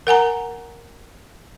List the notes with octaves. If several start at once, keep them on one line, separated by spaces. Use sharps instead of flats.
A#4 F#5 G#5 A#5